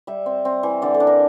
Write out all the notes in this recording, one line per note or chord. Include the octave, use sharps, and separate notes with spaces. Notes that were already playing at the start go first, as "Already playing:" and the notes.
G3 E5
C4
C4
E3
D3 D5
A4
D4
A#4